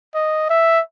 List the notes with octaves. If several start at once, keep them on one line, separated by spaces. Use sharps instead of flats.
D#5
E5